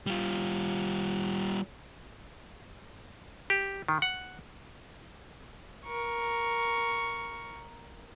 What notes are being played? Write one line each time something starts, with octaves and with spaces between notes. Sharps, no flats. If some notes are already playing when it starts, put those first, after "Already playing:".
G3 F4
G4
D#3
F#5
A#4 C#6